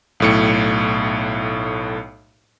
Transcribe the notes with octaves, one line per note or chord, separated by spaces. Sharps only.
B1 A2 C#7